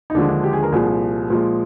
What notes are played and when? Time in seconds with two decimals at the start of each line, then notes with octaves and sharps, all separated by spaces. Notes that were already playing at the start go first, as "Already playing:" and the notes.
0.10 D#4
0.14 D#2 D3 F3 G#3 D4
0.29 D4
0.44 G4
0.53 G#4
0.63 A#4
0.72 C2 A#2 F3 G#4
1.30 A#2 F3 G#3